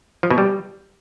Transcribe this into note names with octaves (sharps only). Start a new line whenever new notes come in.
F3
B2
G3